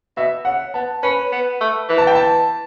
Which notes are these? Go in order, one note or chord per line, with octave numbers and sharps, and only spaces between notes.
B2 E5
C#3 F#5
B3 A5
C#4 B4
B3
A3
E3
A5
G5
A5